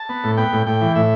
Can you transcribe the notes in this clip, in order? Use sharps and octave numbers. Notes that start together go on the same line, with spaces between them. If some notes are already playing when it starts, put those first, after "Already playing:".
Already playing: A5
B3
A2
B3 G5
A2
A2 G5
E3
A2 E5